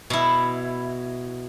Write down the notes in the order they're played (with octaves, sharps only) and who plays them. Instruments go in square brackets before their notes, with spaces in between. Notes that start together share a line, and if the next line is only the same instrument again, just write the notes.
[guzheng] B2 E4